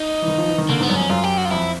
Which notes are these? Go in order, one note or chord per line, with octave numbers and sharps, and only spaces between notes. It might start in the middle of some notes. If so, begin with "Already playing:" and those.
Already playing: D#4
E3
D#3
F3
E3
D#3
D3 A#3
G#2 B3
F#2
F2 C#4
F#2 F4
G4
F#4
F4
F2 E4